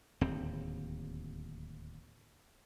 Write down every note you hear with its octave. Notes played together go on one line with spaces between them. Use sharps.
D1 D#2 C4